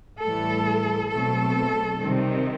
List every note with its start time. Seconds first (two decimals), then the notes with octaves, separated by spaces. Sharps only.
0.22 A2 E3 G3 A4
1.10 B2 F#3 A3 C4 A4
1.99 C3 D#3 G3 C4